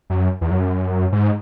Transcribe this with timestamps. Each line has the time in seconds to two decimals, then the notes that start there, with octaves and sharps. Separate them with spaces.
0.10 F#2
0.41 E2
0.51 F#2
1.12 G#2